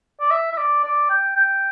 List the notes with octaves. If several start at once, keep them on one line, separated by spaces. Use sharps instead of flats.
D5
E5
E5
D5
D5
G5
G5